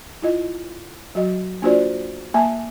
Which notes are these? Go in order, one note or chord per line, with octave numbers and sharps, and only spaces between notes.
E4 F4 D#5
F#3 F#4 D#5
A#3 D4 F4 F#4 C5 D5
A#3 E5 G#5 A5